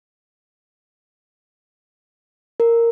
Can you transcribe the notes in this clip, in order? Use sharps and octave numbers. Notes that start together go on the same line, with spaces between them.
A#4